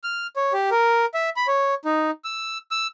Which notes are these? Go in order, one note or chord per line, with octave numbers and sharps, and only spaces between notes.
F6
C#5
G4
A#4
E5
B5
C#5
D#4
E6
E6